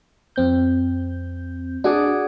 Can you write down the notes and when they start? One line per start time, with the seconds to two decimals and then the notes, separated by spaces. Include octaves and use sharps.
0.36 F2 C4 G6
1.84 D4 F#4 G#4 D5